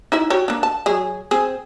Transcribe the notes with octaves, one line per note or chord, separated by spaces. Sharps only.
D#4 E4 E5
F#4 G4 C#5
A#3 D4
A5
F#3 G#4
C4 G#4